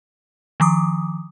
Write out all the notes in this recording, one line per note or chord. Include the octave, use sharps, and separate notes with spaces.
D#3 F3 D6 D#6